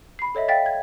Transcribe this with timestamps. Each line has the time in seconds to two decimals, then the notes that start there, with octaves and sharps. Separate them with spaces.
0.19 B5 C7
0.35 A4 C#5 D#5 E5
0.48 F5 G5 A6 B6
0.66 G#6